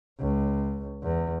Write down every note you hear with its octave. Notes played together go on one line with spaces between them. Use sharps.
C#2
E2